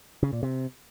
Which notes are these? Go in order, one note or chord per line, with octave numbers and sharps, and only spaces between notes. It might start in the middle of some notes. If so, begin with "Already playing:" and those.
C#3
A#2
C3